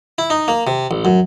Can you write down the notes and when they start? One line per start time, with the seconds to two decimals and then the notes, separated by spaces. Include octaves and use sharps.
0.18 E4
0.30 D#4
0.48 A#3
0.67 C3
0.91 A1
1.05 F#2